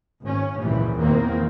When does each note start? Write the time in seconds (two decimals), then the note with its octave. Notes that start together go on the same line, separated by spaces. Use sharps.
0.23 G#1 C#4
0.60 G#1 C#2 F#2 A#2 E3 G3
0.99 E2 A#2 D#3 A#3 C4